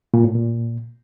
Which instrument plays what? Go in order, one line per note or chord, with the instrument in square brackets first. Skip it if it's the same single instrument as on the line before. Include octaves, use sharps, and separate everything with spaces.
[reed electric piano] A#2
A2
A#2